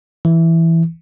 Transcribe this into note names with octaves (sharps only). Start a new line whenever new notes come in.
E3